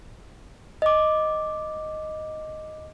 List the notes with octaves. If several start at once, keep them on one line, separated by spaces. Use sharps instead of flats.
D#5 D6